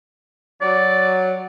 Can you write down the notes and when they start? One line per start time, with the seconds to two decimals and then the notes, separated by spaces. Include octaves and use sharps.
0.62 F#3 D5